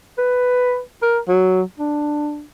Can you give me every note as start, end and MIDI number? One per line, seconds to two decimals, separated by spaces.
0.18 0.80 71
1.02 1.19 70
1.28 1.62 54
1.79 2.44 62